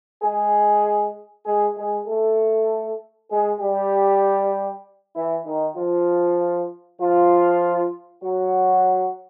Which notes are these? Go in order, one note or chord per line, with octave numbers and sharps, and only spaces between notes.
G#3 G#4
G#3 G#4
G#3 G#4
A3 A4
G#3 G#4
G3 G4
E3 E4
D#3 D#4
F3 F4
F3 F4
F#3 F#4